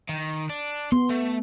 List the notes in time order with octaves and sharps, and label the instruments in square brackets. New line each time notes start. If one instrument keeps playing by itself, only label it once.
[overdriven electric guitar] D#3
D4
[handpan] B3 [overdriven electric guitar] C6
[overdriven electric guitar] A3